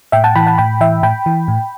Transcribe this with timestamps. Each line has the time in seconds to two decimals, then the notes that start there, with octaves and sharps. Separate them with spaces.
0.12 A2 E5 G5
0.24 F#5 A5
0.35 E3 G5 B5
0.47 F#5 A5
0.58 A2 G5 B5
0.81 E3 E5 G5
1.03 A2 G5 B5
1.26 E3
1.48 A2